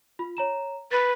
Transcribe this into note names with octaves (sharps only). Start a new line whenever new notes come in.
F4 B5
C#5 A#5 E7
B4 A6